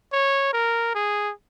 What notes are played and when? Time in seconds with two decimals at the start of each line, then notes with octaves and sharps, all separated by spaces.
0.13 C#5
0.53 A#4
0.95 G#4